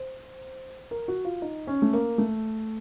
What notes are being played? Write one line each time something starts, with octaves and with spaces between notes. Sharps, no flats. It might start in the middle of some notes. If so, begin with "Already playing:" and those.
Already playing: C5
A#4
F#4
F4
D#4
C#4
A3
A#3
A3